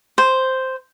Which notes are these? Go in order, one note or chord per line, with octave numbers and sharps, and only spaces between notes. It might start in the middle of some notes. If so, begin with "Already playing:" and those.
C5